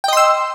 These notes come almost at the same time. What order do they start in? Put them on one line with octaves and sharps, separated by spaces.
G5 D#5 C6 E6